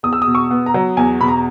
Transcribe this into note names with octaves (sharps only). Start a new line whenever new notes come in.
E2 D#6
E6
D#6
B2
C#6
B3
A#5
F#3
E2 G#5
B2 B5
A#5